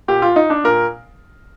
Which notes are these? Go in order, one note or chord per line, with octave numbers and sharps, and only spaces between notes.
A#2 G4
F4
D#4
D4
A#2 A#4